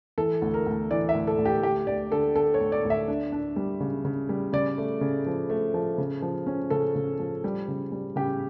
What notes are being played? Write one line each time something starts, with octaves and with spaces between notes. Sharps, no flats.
E3 A4
D2
A#4
D2
E3 D5
E5
D2
A4
D2
G4
D2 G4
D2 D5
D3 A4
D3 A4
C#5
D2
D5
D2
E5
D4
D4
G3
C#3
C#3
G3
C#3 D5
A3
C#3
F3
A3
F3
C#3
F3
C#4
C#3 A4
C#3
F3
G3
C#3
G3
C#3 G4